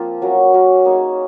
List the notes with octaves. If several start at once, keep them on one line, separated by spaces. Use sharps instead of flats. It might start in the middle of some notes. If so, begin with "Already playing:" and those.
Already playing: F3 A#3 C4 F4
F#3 C#4 F#4 A#4
F#3 C#4 F#4 A#4
A#3 D#4 G#4 C#5